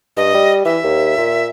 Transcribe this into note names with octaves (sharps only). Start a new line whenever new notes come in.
G2 D#5
G3
E3 E5
D#2
A#2